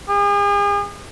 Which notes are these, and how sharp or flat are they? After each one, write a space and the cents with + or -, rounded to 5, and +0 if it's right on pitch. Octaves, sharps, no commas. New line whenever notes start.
G#4 -40